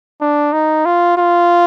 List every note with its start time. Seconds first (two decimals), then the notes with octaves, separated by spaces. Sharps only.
0.21 D4
0.53 D#4
0.85 F4
1.18 F4